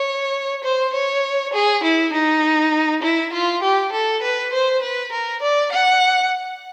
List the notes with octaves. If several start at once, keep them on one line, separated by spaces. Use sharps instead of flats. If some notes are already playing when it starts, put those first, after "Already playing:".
Already playing: C#5
C5
C#5
G#4
E4
D#4
E4
F4
G4
A4
B4
C5
B4
A#4
D5
F#5